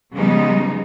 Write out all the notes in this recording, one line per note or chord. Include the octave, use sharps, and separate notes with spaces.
C#3 F3 G3 G#3 B3 D#4